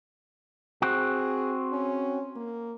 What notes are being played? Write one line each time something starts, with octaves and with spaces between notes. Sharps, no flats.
C4 F#4 G#4
C#4
A#3